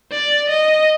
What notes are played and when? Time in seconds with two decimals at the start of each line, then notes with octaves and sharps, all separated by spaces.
0.12 D5
0.49 D#5